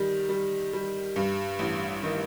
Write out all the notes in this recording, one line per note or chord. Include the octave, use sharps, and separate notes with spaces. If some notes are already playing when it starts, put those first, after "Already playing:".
Already playing: D#3 G3
G3
G3
G2
A1
D#3